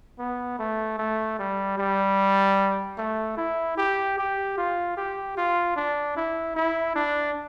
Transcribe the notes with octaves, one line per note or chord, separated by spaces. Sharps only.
B3
A3
A3
G3
G3
A3
E4
G4
G4
F4
G4
F4
D4
E4
E4
D4